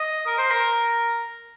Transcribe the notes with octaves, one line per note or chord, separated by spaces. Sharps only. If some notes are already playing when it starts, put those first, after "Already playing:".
Already playing: D#5
A#4
C5
A#4